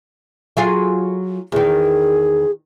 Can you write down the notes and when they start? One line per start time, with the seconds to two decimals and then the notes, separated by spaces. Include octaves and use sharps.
0.57 F#3 F4 G#4
1.52 E2 D#3 G#4